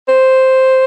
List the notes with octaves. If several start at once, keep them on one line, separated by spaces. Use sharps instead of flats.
C5